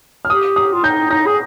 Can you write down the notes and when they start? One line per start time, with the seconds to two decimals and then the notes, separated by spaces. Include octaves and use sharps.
0.25 F6
0.30 G4 D#6
0.56 D#6
0.73 F4
0.84 D#4 G6
1.11 D#4 A#6
1.27 G#4